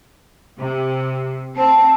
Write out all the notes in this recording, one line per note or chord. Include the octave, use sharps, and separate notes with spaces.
C3
C4 A5